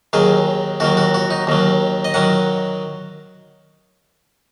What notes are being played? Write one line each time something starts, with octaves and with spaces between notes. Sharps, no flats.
D#2 D#3 F#3 G#4
D#2 D#3 F#3 F#4
F#4
F#4
D#4
D#2 D#3 F#3
D#5
D#3 F#3 F#5